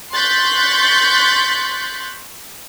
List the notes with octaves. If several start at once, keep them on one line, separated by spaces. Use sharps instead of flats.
C6 C#6 F#6 G6 A6 B6